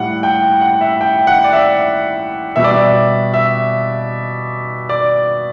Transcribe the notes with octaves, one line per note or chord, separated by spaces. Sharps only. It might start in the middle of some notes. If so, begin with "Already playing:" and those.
Already playing: A2 G3 F#5
G5
F#5
E5
G5
F#5
D5
E5
B2 G3 E5
D5
E5
E5
D5